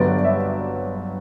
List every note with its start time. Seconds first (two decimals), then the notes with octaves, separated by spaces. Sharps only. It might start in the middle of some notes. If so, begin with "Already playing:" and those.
Already playing: G1 G2 F#3 B3 D5
0.24 E5